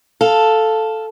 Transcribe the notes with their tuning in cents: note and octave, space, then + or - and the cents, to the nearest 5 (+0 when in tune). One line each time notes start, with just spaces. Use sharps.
A4 +0 F5 +0